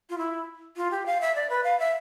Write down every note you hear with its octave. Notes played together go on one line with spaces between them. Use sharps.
F4
E4
F4
G4
F5
E5
D5
B4
F5
E5